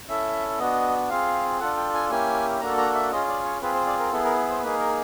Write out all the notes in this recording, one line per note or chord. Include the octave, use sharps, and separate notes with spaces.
C#4 E4 A4 E5
B3 D4 F#4 D#5
C4 F4 G#4 F5
D4 F4 A4 F#5
G5
G#5
A#3 C#4 E4 G4 G#5
A#3 D4 F#4 A4 A#5
A#5
E5
C#4 F4 G#4 D#5
D5
C#5
C4 F4 G#4 B4
C5
D5
A#4
B3 E4 G#4 A4
A#4
C5
A#3 D#4 G#4 B4
A#4